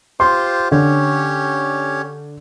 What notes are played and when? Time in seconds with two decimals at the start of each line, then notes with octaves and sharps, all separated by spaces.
0.20 F4 G4 C5 C6
0.72 D3 C#4 G4 C#5